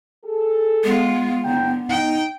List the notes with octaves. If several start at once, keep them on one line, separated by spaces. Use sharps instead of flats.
G#4 A4
G#3 B3 F4
F#1 D3 G5 A#5
D#4 G5